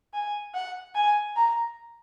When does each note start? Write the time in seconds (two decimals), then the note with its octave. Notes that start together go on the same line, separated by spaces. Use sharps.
0.13 G#5
0.54 F#5
0.95 G#5
1.36 A#5